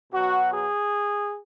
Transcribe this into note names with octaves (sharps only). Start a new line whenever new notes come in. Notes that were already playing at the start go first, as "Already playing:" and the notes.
B2 F#3 F#4
G#4